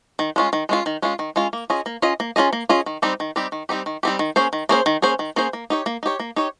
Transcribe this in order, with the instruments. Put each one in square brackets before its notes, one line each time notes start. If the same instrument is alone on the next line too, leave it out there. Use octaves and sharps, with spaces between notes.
[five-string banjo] D#3
G#3 C#4 F4
D#3
G#3 C#4 F4
D#3
G#3 C#4 F4
D#3
G#3 C#4 F4
A#3
C#4 F4 G#4 D#5
A#3
C#4 F4 G#4 D#5
A#3
C#4 F4 G#4 D#5
A#3
C#4 F4 G#4 D#5
D#3
G3 C4 D#4 G4
D#3
G3 C4 D#4 G4
D#3
G3 C4 D#4 G4
D#3
G3 C4 D#4 G4
D#3
A#3 C#4 G#4 C5
D#3
A#3 C#4 G#4 C5
D#3
A#3 C#4 G#4 C5
D#3
A#3 C#4 G#4 C5
A#3
D#4 G4 C#5
A#3
D#4 G4 C#5
A#3
D#4 G4 C#5